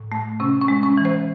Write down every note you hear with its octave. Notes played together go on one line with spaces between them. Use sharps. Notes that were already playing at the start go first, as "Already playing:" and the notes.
Already playing: A2
A3
C3 C#4
C#4
G#3
C#4
E3
C5